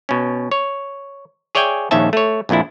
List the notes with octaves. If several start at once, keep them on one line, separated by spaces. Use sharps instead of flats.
B2 C#4
C#5
G#4 C#5 D5 E5 G5 G#5
A#1 D#2 D#3 C#4 E5 A5
A3 C#5
A#1 F2 A#2 D4 E4